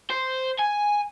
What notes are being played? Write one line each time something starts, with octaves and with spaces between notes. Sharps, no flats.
C5
G#5